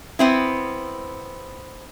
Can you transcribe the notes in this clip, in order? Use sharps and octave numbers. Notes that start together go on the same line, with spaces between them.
B3 C4 E4